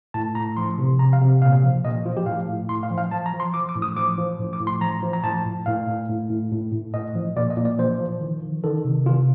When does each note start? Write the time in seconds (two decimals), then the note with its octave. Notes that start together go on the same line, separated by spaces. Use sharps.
0.14 A2 A5
0.35 A2 A#5
0.57 F3 C6
0.78 C3
0.99 C3 A#5
1.13 F5
1.21 C3
1.42 A#2 F5
1.63 F3
1.84 A#2 D#5
2.06 F3 F4
2.17 G4
2.26 A2 F5
2.48 A2
2.69 A2 C6
2.83 F5
2.90 F3
2.98 F5
3.11 F3 A5
3.26 A#5
3.33 F3
3.40 C6
3.54 F3 D6
3.69 D6
3.76 A2
3.82 D#6
3.96 F3 D6
4.18 F3
4.39 A2
4.53 D6
4.60 A2
4.67 C6
4.81 F3 A#5
5.03 F3
5.13 A#5
5.24 A2 A5
5.45 A2
5.66 A2 F5
5.87 A2
6.09 A2
6.30 A2
6.51 A2
6.72 A2
6.94 A2 D#5
7.15 F3
7.36 A#2 D5
7.50 D#5
7.57 A#2
7.65 D5
7.78 F3 C5
8.00 F3
8.21 D#3
8.42 D#3
8.64 D#3 A4
8.85 C3
9.06 C3 F4